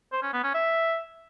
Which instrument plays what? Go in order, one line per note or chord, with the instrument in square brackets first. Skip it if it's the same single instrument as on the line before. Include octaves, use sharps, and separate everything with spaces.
[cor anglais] C5
C#4
B3
C#4
E5